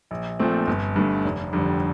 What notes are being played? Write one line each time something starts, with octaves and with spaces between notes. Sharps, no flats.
A#1
A#2 F3 A3 C4
G1
G2 D3 A3
F1
F2 D3 G3